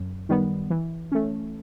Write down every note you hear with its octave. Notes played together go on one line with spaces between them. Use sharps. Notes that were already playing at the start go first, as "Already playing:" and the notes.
Already playing: F#2
D#3 G3 B3
E3
A3 C#4